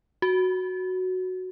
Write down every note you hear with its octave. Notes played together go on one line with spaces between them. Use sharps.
F#4